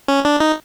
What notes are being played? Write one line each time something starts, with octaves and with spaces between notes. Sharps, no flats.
C#4
D4
D#4